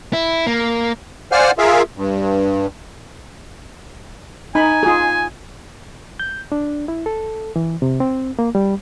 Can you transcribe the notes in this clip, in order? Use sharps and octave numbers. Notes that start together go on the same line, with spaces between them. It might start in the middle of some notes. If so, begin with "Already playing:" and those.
E4
A#3
C5 D5 F5 F#5 G#5 F6
F4 G#4 A#4 E5 F5
G2
D#4 G#5 B5
F4 G#4
G6
D4
E4
A4
E3
C3
C4
A#3
G3